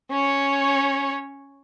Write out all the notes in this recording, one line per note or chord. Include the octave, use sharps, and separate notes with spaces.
C#4 C#5